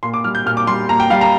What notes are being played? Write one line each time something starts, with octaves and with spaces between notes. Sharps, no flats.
A#2 C6
D6
G3 F6
G6
A#2 F6
D6
G3 C6
A#2 A#5
G5
G3 F5
A#5